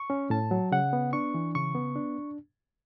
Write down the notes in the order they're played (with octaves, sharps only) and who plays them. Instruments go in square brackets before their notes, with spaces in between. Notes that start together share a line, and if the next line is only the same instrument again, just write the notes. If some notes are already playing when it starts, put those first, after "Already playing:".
Already playing: [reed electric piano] C#6
C#4
A2 A5
F#3
C#3 F#5
B3
D4 C#6
E3
C#3 C#6
B3
D4